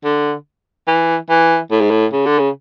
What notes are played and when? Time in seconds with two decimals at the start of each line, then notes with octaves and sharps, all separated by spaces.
0.04 D3
0.88 E3
1.30 E3
1.71 A2
1.81 G#2
1.91 A2
2.13 C#3
2.26 D3
2.39 C#3